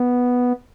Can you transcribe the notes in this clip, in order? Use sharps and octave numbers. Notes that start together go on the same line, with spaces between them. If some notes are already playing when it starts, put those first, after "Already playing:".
Already playing: B3